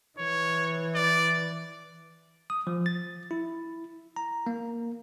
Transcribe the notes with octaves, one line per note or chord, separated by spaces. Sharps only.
E3 C#5
D5
D#6
F3
A6
E4
A#5
A#3